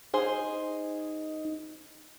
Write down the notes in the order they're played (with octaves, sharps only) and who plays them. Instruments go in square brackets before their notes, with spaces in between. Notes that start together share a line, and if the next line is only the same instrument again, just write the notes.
[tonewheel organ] D#4 [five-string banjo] G#4 C5